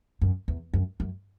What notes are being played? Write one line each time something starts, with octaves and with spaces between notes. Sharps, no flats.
F#2
E2
F#2
F#2